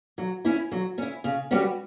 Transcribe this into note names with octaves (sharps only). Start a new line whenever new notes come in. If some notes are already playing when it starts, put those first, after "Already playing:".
F#3
C#4 E4
F#3
C#4 E4
C#3
G3 C#4 F#4 B4